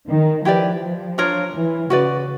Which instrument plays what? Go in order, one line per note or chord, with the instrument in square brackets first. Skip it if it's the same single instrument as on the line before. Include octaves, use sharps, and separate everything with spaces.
[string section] D#3
[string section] F3 [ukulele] E4 G4 B4 D5
[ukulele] D4 F4 A#4 C#5
[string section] E3
[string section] C#3 [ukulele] F#4 B4 D5